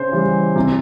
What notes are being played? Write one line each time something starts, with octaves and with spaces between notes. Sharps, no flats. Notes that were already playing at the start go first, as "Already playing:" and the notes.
Already playing: C#3 C5
E3 G3
C3